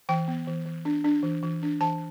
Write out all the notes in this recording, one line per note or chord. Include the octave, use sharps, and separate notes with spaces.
E3 G5
B3
E3
E3
D4
D4
E3
E3
D4
E3 A5